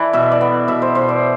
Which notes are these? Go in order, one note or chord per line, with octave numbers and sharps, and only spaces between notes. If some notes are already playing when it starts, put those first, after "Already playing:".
Already playing: E3 E4 A4 B4 D5
B2 E5
D5
B3
B2 E5
C5
B2 C5
D5